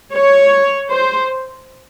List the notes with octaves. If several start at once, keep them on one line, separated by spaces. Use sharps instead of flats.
C#5
C5